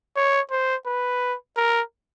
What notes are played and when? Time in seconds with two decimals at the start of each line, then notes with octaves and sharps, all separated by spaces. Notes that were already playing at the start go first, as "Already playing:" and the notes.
0.16 C#5
0.51 C5
0.86 B4
1.57 A#4